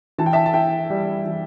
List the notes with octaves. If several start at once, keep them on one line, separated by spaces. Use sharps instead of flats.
E3 A5
G5
E5 A5
A5
E4 G5
G3
E3